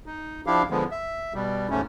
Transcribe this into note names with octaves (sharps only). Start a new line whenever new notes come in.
D#4
F3 D4 E4 G4 F5
D3 F3 G#3 B3
E5
B2 G3
D#2 G#2 A3 C#4